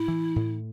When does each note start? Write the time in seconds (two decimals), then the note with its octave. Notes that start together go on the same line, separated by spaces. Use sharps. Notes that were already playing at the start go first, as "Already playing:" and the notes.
Already playing: A2 E4
0.08 E3
0.36 A2